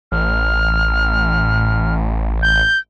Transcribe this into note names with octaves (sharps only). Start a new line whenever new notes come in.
A1 F6
G6